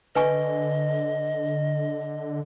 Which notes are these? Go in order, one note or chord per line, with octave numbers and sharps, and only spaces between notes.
D3 B4 D#5 G#5 C#6